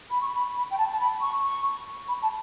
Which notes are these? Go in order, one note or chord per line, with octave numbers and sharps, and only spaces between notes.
B5
C#6
B5
B5
G5
A5
A5
B5
C#6
C#6
B5
A5